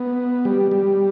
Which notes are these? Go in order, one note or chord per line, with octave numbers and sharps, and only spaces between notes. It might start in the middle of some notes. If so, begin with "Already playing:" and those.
Already playing: B3
G3
G3